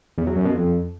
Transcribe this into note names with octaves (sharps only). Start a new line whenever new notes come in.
E2
F#3
F#2
B2
F2